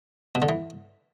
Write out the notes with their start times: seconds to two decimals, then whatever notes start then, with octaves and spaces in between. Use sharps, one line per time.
0.35 B2
0.42 D3
0.49 E3